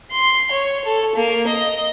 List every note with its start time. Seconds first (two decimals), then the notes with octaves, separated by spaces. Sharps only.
0.12 C6
0.51 C#5
0.85 A4
1.15 A#3
1.47 D#5